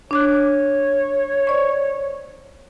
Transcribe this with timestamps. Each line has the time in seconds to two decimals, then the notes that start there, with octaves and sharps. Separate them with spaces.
0.11 D4 C#5 D6 F#6
1.47 C5 D5 C#6